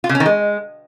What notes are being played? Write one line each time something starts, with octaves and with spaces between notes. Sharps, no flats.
F4
C#3
C#4
D#3
G#3